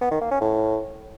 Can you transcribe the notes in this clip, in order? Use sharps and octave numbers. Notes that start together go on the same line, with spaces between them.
B3
D#3
A#3
C#4
A2